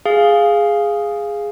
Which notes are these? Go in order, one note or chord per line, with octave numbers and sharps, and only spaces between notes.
G#4 F5